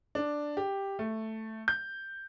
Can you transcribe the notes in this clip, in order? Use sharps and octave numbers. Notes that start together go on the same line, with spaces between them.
D4
G4
A3
G6